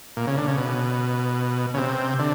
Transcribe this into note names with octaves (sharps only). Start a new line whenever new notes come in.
A#2
C#3
D3
C#3
B2
C#3
C3
D3